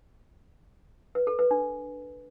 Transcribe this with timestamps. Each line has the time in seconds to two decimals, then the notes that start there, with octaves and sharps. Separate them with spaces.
1.15 B4
1.27 A4
1.39 B4
1.51 D4